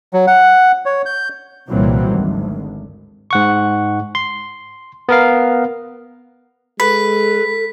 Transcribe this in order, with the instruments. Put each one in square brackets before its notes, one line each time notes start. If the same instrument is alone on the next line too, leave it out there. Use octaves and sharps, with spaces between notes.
[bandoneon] F#3
F#5
C#5
G6
[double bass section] C2 A#2 E3 F#3 G3 C4
G#1 D2
[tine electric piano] G#2 F#5 C#6
C6
B3 A#4 F5
[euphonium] G#3 [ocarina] A4 [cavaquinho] B4 [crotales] B6